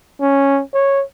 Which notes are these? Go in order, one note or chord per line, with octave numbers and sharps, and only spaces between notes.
C#4
C#5